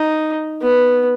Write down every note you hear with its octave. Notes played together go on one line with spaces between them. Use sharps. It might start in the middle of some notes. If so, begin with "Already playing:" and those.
Already playing: D#4
B3